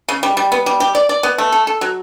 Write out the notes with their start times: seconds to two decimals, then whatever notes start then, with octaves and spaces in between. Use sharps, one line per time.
0.09 C#3
0.23 G3
0.37 G3
0.52 B3
0.66 G3
0.80 G4
0.95 D5
1.09 D5
1.23 B3
1.38 A3
1.52 A4
1.67 A4
1.81 F#3